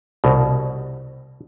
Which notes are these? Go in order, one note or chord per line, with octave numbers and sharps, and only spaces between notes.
C2 B2